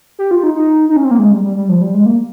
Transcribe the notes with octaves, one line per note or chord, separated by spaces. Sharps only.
G4
F4
D#4
D#4
D#4
C#4
C4
A#3
G#3
G3
G3
G3
F3
G3
G#3
A#3